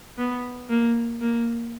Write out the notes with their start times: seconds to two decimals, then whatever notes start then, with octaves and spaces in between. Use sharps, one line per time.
0.18 B3
0.69 A#3
1.21 A#3